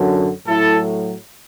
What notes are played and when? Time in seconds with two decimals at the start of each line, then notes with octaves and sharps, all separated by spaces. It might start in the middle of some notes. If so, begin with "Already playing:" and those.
Already playing: F#2 D3 F#3
0.47 A2 F#3 E4 A4